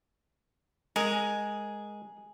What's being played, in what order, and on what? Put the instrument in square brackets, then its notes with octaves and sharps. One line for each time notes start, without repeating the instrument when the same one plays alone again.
[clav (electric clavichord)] G#3 A#4 [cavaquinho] G#4